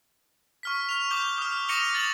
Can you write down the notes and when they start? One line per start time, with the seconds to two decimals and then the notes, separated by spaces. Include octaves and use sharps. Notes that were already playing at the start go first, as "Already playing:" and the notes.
0.63 C#6 F6 B6
0.89 F6 F7
1.11 D6 G6 G7
1.38 D#6 F6
1.69 D6 A#6 C#7 D#7 F7 G7
1.93 D#6 A6 F#7